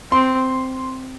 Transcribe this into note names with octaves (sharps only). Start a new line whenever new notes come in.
C4 C6